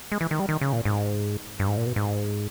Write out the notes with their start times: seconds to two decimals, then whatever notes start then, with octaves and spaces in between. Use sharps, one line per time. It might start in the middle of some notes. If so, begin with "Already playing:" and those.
0.12 G#3
0.21 E3
0.31 D#3
0.40 G3
0.49 D#3
0.61 C#3
0.73 A#2
0.85 G#2
1.59 G2
1.68 G#2
1.77 A#2
1.87 B2
1.96 G#2